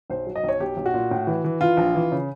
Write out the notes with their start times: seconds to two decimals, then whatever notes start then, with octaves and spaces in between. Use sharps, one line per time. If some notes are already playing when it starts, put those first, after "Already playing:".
0.10 B1 C5
0.26 F#3
0.36 D#5
0.44 B1 C#5
0.60 B1 G4
0.77 B1
0.86 F#4
0.94 A#2
1.11 A2
1.27 E3
1.44 E3
1.61 E3 F4
1.77 A#1
1.95 E3
2.12 C#3